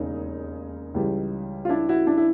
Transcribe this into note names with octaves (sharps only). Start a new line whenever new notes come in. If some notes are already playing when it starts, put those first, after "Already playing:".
Already playing: E1 D#2 C#3 G#3 C#4 D#4
C#2 C#3 E3 G3
F4
D4 E4
E4 F#4
D4 E4
E4